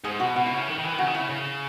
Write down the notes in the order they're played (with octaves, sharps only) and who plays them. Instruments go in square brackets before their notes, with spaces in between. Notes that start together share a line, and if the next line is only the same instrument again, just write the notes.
[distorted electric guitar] G#2 [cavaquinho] G#4
[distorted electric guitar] B2 [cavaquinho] F#4
[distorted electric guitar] B2 [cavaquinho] F#4
[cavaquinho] E4
[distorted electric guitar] C#3
[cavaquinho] E4
[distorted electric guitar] D#3
D#3
E3
D#3
[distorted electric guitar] C#3 [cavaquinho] F#4
[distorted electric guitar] D#3
[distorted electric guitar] C#3 [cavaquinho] E4
[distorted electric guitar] C#3